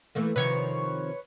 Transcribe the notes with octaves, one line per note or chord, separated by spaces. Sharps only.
E3 A3 A#3
C3 D#3 F3 B4 C#5 C#6